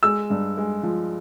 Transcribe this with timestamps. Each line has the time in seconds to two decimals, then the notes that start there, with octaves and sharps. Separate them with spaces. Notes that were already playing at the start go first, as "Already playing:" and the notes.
0.03 G#3 E6
0.30 G2
0.57 G#3
0.83 F3